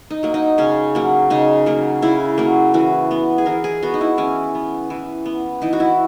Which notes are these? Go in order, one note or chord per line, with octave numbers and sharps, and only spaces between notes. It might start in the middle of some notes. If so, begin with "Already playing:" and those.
D#4
F#3 A#3
D#4
C#3 C#4
F#3 A#3
C#3 D#4
F#3 A#3
C#3 E4
F#3 A#3
E3 F#4
B3
G#4
E3 A#4
G#4
B3 F#4
D#4
E4
E3 C#4
B3
E3
B3
E3 D#4
F#4
E4